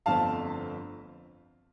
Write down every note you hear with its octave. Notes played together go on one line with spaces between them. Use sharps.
G1 F2 D3 A3 C4 F5 A5